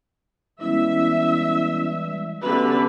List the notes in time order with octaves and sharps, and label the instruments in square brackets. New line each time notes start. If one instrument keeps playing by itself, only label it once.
[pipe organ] E3 G3 G#3 [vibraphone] B3 C#4 E4 [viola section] E5
[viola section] D3 A3 B4 [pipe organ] B3 C#4 G4 [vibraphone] F#4